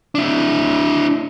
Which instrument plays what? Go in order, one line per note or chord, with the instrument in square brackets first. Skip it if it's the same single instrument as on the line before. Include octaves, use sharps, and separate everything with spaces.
[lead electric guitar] D4 E4